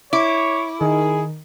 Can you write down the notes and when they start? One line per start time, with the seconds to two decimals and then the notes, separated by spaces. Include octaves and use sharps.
0.13 E4 C#5 D6
0.81 D#3 G#4